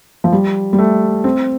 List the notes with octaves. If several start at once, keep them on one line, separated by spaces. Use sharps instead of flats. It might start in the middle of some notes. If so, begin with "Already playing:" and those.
F3
G3
G3
A3
C4